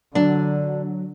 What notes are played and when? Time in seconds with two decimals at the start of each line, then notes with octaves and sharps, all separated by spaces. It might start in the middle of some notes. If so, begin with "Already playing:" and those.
0.15 D3 F#3 D4